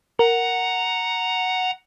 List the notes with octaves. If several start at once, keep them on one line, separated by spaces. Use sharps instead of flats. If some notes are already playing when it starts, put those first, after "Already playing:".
A#4 F#5 A#5